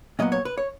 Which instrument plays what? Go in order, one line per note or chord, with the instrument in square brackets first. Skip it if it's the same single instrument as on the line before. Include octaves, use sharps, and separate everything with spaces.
[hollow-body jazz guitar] A#2 F#3 B3 D#5
C#5
B4
C#5